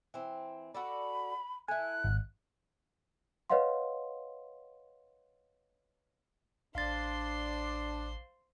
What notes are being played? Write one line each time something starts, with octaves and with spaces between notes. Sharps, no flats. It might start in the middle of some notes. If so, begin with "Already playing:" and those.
E3 C4
F#4 A4 D5 B5
E4 A4 G#5 F#6
G#1
B4 C#5 D#5 F5 F#5 C6
A1 D4 C5 F5 C6 A6